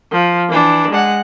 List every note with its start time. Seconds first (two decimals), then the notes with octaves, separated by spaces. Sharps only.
0.12 F3
0.50 E3 D4
0.91 G#3 F#5